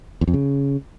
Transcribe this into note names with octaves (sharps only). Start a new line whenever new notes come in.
E2
F2
C#3